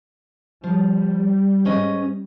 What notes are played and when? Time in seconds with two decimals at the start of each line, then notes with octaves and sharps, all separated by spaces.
0.64 F3 G3
1.65 G#2 C#4 D#5